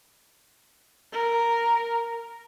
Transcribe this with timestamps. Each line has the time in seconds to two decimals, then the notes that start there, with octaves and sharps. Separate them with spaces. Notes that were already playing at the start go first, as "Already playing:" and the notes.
1.13 A#4